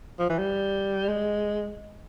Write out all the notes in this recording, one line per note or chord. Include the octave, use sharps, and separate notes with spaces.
F3
E3
G3
G#3